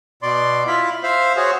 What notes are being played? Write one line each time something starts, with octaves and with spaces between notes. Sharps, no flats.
B2 D5 C6
E4 F4 B5
C5 E5 F5
F#4 G#4 C5 C#5